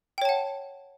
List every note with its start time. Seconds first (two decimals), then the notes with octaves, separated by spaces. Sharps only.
0.18 G5
0.22 C#5
0.25 A5
0.29 F#5